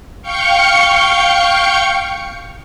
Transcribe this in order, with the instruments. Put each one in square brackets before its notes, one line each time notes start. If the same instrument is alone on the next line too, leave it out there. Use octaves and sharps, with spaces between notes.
[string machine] F5 G5 C#6 G6 C#7